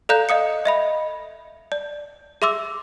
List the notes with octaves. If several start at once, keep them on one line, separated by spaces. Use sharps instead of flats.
A4 D5 F5 A#5 F#6 G6
D#5 F5 D#6 C#7
D#5 E5 B5
D5
G#4 E5 C6 D6 E6